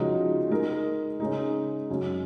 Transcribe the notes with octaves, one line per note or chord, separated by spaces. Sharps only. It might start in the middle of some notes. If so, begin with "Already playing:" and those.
Already playing: C#3 F3 G#3 D#4 F#4
G#3 D#4 A#4
C#3 G#3 D#4
F#2 C#3 G#3